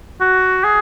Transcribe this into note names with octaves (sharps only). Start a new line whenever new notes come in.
F#4
G#4